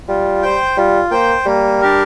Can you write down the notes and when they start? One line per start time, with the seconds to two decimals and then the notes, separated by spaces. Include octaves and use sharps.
0.08 G3 F4
0.43 C5 G5
0.77 G3 F4
1.11 A#3 C5 G5
1.46 G3 A#3
1.81 D4 G4 A#4